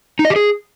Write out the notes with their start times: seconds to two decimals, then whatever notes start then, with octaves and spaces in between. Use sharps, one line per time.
0.19 D#4
0.25 D#5
0.30 G4
0.36 G#4